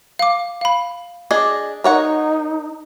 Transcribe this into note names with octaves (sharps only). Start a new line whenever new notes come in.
F5 D6
F5 B5
D4 G#4 D#5 G#6
D#4 A#4 C#5 F#5